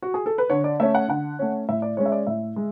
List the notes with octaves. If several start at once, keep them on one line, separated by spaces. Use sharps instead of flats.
F#4
G#4
A4
B4
D3 C#5
D5
A3 C#4 E5
F#5
D3 F#5
A3 C#4
A2 E5
D5
G#3 C#4 C#5
E5
D5
A2 E5
G#3